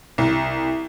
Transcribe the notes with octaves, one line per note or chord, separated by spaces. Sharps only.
C2